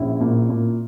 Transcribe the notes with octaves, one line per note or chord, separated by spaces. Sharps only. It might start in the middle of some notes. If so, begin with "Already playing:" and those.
Already playing: A#1 C#4 E4
A#2
A#2